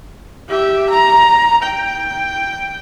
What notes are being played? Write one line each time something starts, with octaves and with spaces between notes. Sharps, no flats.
G4 E5
A#5
G5